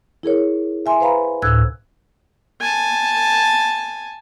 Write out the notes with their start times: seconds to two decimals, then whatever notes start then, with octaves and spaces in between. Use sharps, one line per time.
0.23 E4 G#4 A#4 C#5
0.86 E5 G#5 C6
1.01 B4 C5 F5 A#5 B5
1.42 D2 A2 E6 F#6 G#6
2.61 G#5 A5